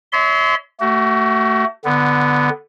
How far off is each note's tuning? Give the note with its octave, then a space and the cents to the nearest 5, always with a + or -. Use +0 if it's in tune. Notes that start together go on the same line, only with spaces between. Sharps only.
C#5 +35 E5 -35 C6 -25
A3 +20 F#4 +35
D3 +0 B3 +0